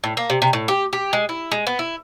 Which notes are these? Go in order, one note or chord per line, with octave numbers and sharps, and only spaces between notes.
A2
A#3
C3
C3
A2
G4
G4
G#3
E4
G#3
B3
E4